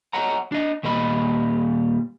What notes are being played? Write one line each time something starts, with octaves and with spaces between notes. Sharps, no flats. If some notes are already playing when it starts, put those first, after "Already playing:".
C#5 D#5 F#5 A#5
D4 D#5
D#2 A#2 G3 D#5 B5